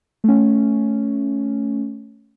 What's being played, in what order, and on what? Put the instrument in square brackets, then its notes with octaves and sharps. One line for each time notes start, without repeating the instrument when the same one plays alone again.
[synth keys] A3 C#4